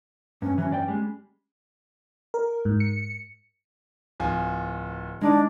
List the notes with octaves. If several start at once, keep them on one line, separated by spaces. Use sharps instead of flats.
G2 C#4
E3 F#3 C#4
G2 D5 G5
G3 G#3
A#4
G#2
C#7
D1 F3 G#5
G#3 D4 D#4 D5